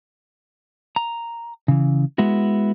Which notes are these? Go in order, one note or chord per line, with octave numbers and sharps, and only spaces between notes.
A#5
C#3 E3
G#3 B3 E4 F#4